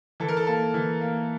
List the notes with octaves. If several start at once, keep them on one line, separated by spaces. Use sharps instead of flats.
E3 A4
A#4
A4
A#3 A4
E3
A#3